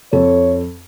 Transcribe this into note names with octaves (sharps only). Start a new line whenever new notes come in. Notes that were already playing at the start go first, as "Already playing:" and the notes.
F2 A4 C#5